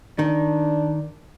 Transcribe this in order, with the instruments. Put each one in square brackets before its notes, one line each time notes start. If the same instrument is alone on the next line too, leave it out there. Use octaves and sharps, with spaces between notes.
[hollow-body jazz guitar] D#3 [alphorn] D4